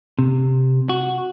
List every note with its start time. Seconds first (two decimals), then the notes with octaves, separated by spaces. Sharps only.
0.19 C3
0.89 F#4